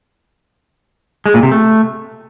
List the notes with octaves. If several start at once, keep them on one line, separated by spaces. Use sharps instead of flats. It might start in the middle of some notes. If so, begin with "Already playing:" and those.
G#3
A#2
C3
A3